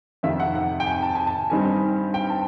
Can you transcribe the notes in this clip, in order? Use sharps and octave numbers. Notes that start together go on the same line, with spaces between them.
F2 C3 D#3 E5
F#5
F#5
G5
G#5
A5
G#5
A5
G2 D#3 G3 C4 D#4 G#5
G5
A5